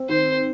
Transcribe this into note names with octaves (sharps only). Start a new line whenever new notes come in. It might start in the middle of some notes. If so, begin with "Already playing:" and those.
Already playing: C4
D#3 C5